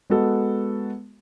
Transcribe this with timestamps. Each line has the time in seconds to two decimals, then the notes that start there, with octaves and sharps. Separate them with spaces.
0.10 G#3 B3 F#4 A4